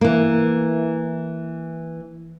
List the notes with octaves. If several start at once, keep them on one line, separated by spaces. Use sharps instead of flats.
E3 A#3